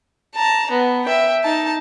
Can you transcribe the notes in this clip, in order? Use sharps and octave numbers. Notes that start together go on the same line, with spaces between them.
A5 A#5
B3
E5 G5
D#4 A5